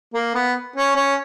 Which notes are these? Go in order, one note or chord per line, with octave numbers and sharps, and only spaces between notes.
A#3
B3
C#4
C#4